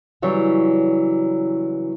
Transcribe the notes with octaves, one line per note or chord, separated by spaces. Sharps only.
C#3 E3 F#3 G3